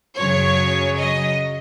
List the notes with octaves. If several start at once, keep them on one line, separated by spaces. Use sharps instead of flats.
F#2 C#3 F#3 C#5
D#5